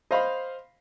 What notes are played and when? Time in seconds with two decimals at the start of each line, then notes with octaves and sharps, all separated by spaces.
0.11 C5 D#5 F5 B5 C6